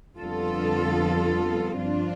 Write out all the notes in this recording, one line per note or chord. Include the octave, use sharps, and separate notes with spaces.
F2 D3 G3 B3 F4 A4
G2 F3 C4 D4 F4